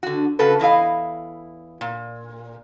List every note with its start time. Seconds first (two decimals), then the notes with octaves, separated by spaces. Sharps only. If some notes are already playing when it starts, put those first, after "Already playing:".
0.03 D3 F#4
0.39 C#3 F#4 A4 B4
0.59 E2 E4 D#5 F5
1.81 A#2